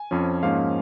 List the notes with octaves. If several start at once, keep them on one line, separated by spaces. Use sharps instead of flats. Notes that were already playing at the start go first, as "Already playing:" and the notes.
Already playing: G#5
F2 F3 C#4
G#2 F3 A#3 C#4 F5